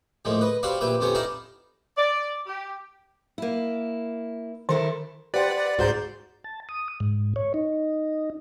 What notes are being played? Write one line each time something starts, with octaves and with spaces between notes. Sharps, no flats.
A2 F3 G#3 A#3
B4 D#5
C4 F#4 G4 D5 F5 B5
A#1 E4 G4 B4 D6
F2 C3 B3 C#4 G4 D6
D#4 E4 D5 F5 A5 A#5
D5
G4
A#3 E4
D#3 E4 A4 A#4
G4 B4 C5 D5 F#5 G5
C#2 G#2 F#4 C5 F#5 A#5 G6
A5
D#6
G#2
C#5
D#4